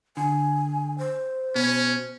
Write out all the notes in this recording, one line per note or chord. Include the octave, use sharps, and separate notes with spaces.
D3 G#5
C5
B2 C#4